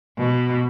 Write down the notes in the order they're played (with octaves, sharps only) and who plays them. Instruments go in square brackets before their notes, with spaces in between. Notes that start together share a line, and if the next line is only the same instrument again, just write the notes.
[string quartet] B2